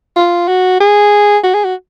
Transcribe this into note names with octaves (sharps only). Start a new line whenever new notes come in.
F4
F#4
G#4
F#4
G#4
F#4